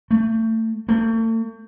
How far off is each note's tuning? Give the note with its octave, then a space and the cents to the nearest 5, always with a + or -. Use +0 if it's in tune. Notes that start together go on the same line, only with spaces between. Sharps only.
A3 +30
A3 +40